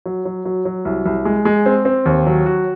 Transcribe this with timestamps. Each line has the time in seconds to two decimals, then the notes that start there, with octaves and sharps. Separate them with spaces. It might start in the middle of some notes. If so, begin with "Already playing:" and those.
0.06 F#3
0.25 F#3
0.45 F#3
0.65 F#3
0.85 C2
1.06 C2
1.25 G#3
1.45 G#3
1.66 C4
1.85 C4
2.05 D#2
2.27 F#3
2.46 F#4